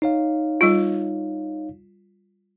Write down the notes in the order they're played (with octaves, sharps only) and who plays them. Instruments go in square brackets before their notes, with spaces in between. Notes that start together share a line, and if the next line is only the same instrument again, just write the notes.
[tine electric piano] D#4 C#5 F5
[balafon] G3 F4